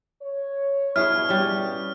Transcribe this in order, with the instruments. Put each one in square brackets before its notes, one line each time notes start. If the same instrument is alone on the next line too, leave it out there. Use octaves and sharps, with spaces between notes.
[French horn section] C#5
[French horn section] G2 B2 [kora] E4 G#4 C#5 [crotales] F6
[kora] G3 C#4